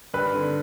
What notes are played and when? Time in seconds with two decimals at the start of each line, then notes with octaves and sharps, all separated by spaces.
0.14 G2 B4
0.35 D3